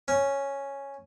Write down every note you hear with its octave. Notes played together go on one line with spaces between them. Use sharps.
C#4